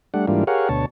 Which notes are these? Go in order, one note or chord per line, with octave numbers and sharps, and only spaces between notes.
G3 A3 D4 F#5
G#2 E3 G3 A#3 D4 F4
G4 G#4 A#4 C#5 F5 F#5
D2 B2 C#5 A5